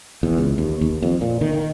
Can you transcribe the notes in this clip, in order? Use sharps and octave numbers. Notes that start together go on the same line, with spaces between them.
E2
C#2
D#2
D#2
F2
A#2
D#3
D#3